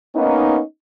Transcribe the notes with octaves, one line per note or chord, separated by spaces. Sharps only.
A#3 B3 C#4 D#4